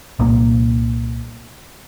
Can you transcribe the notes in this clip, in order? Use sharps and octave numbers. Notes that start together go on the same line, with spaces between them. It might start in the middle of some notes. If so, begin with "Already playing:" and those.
C2 A#2 A#3